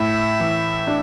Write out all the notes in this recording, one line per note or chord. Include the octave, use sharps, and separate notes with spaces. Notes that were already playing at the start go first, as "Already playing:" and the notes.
Already playing: A2 E5
E3
D4